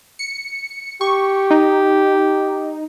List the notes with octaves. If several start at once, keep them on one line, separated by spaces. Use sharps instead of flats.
C#7
G4 C#6
D#4